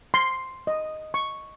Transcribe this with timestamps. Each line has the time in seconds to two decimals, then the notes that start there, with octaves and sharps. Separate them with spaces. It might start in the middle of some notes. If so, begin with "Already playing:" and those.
0.14 C6
0.67 D#5
1.14 C#6